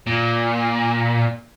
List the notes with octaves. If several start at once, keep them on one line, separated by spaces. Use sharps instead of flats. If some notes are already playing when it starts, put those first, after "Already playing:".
A#2